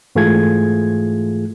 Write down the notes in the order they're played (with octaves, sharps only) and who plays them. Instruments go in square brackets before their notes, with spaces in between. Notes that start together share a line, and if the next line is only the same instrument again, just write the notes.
[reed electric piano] G#2 E3 A3 F4 G#4 G#6